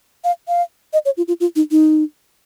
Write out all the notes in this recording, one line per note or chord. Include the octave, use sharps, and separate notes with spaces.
F5
F5
D#5
C#5
F4
F4
F4
D#4
D#4